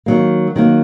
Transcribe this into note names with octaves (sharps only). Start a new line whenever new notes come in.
D#3 F#3 A#3
D#3 F#3 A#3